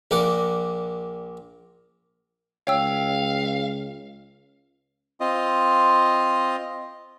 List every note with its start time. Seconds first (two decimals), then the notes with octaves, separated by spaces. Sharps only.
0.11 A#1 A#3 D5 F#5
2.67 C#2 C#5 F5 G5 E6
5.20 C4 F4 D#5